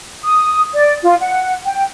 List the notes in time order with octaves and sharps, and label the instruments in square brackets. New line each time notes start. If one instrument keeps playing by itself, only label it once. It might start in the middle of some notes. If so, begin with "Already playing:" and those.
[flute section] D#6
D5
F4
F#5
G5